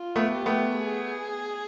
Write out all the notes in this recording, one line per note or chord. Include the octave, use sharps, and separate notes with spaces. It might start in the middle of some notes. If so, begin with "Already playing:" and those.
Already playing: F4
A3 B3
G4
A3 B3
G#4